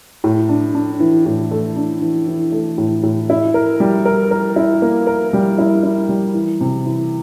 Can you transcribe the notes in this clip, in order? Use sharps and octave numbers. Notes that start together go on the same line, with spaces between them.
A2
D4
D4
E3
A2
A3
D4
E3
E3
A3
A2
A2
E4
A#4
G3
A#4
A#4
E4
A#3
A#4
G3
E4
E4
G3
E3
C3
E3